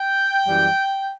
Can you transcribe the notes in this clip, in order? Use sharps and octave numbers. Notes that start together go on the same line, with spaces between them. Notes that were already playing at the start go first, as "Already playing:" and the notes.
Already playing: G5
F#2 E3 G3